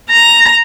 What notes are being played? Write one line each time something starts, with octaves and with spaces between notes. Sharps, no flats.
A#5